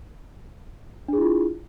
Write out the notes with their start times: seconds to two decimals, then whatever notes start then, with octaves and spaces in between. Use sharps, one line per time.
1.08 D4
1.13 G#4
1.17 E4
1.22 F4